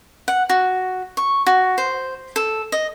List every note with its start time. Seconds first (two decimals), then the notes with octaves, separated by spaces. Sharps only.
0.28 F#5
0.49 F#4
1.17 C#6
1.47 F#4
1.78 C5
2.36 A4
2.72 D#5